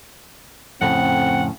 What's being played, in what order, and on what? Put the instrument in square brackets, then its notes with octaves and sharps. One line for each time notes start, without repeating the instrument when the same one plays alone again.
[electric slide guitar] F2 A2 C#3 [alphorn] C4 [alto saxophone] F#5